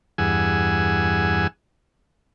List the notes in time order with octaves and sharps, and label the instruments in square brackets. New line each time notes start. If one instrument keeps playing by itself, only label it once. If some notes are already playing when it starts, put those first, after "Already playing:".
[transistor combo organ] E2 G2 G#4 F#5 G#5 E6